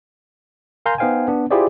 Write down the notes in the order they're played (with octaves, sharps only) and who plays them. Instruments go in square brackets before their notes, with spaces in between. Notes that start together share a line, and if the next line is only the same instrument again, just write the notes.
[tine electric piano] A#4 F5 G#5 A#5 C6 G6
B3 D#4 C5 F5 G5 G#5
B3 D4
E4 F4 G4 G#4 C5 D5